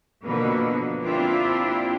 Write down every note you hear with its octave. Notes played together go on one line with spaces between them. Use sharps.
B2 D3 F3 A#3 B4
A#3 C4 D4 E4 F4 G4